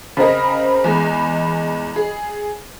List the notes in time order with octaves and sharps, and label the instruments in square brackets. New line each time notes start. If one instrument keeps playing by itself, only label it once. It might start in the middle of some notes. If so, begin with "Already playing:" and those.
[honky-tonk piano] C#3 C4 A#4 [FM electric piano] D#5 A#5 B5
[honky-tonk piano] E2 G#3
G#4